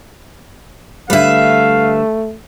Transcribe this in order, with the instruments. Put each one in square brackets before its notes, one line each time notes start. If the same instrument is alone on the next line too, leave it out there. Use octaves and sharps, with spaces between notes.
[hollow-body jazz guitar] D3 G3 [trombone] A3 [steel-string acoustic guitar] B4 E5 [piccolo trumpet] F5